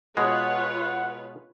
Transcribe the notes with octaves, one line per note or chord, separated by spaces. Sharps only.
B2 G#3 F4 B4 C#5 F#5